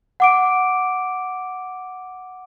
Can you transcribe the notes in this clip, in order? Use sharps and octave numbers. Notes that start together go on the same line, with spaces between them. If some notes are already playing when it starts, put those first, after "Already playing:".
F#5 D6 D7